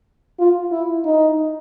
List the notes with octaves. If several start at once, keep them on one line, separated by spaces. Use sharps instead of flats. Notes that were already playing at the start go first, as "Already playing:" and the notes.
F4
E4
D#4